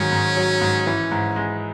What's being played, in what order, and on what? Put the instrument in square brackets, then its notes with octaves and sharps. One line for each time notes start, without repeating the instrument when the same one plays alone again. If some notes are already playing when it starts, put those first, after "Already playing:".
Already playing: [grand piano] G#2 D#3 F#3 [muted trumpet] C#4
[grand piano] G#2
F#3
G#2
E3
G#2
G#3